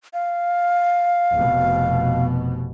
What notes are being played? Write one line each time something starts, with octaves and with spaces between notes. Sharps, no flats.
F5
F1 B2